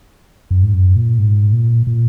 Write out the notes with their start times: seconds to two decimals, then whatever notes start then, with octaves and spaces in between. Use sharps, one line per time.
0.51 F#2
0.63 G#2
0.73 F#2
0.96 A#2
1.18 G#2
1.53 A#2
1.87 A#2